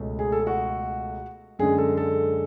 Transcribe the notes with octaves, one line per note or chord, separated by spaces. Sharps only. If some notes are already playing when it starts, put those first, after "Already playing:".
Already playing: C#2 B2 A3 C#4
G#4
A4
G#4
F#4
F#2 D3 G#3 G#4
A4
A4